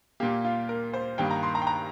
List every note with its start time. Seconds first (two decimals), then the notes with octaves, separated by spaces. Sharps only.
0.20 A#2 A#3 G4
0.44 F4
0.69 A#4
0.94 C5
1.18 G2 D#3 A#3 G5
1.31 A#5
1.43 C6
1.55 A#5
1.62 G5
1.67 A#5